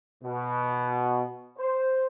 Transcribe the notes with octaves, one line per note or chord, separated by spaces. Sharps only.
B2
C5